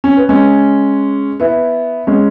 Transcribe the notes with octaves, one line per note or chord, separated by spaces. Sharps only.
C#4
B3
G#3 C#4
B3 E4
G#3 C#4